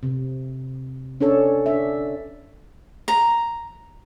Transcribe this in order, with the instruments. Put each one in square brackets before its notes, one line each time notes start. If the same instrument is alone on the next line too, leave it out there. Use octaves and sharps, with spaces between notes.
[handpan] C3
C#4 D4 A4 C#5
D4 E5
[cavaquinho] A#5